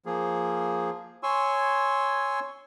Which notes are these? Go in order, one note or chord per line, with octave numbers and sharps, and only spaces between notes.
F3 A#3 G#4
C#5 G#5 C6 C#6 E6